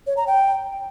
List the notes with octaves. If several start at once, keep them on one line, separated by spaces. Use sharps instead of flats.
C#5
A#5
G5